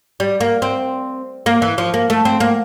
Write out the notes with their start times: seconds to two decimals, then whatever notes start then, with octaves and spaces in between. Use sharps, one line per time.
0.20 G3
0.41 A#3
0.62 C4
1.46 A#3
1.62 E3
1.78 F3
1.94 A#3
2.10 A3
2.25 C4
2.40 A#3